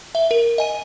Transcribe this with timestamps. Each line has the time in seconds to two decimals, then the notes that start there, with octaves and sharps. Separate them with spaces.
0.15 E5 G7
0.31 A#4
0.58 D#5 G#5 D#7